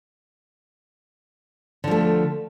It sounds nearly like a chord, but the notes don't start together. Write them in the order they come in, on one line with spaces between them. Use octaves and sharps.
D3 F3 A3